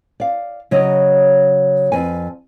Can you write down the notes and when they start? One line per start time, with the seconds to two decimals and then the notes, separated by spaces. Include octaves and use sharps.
0.20 D5 F5
0.71 C#3 F#3 C#5 D#5
1.92 F2 B4 G#5